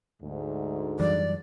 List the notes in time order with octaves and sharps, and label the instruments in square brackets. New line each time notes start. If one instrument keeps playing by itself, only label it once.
[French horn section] D2 G#2
[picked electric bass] F#2 E3 G3 [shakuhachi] D5